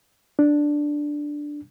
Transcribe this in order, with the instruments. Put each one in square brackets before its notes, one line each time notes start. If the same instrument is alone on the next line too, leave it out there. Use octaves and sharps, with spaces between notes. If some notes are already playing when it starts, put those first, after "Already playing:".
[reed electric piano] D4